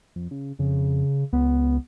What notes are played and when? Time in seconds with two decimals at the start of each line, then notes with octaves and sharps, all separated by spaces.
0.16 F2
0.31 C#3
0.59 F2 C#3
1.33 C#2 B3